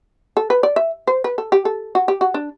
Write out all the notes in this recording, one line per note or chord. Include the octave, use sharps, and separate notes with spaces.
A4
B4
D5
E5
C5
B4
A4
G4
A4
F#4
G4
F#4
D4